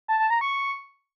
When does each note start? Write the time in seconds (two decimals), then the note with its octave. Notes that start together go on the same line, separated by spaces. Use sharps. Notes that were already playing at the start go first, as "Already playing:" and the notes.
0.08 A5
0.19 A5
0.30 A#5
0.41 C#6